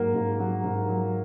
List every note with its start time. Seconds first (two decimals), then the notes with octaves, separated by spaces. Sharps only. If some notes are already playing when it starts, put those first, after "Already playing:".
Already playing: G#2 F#3 A#3
0.14 G#2
0.39 F#3
0.64 G#2
0.89 F#3